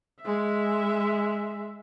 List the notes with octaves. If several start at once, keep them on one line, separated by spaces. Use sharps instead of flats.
G#3 E5